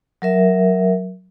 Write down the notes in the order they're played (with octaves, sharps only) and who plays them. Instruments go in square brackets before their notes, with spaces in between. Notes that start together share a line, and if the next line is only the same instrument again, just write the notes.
[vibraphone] F#3 A#4 E5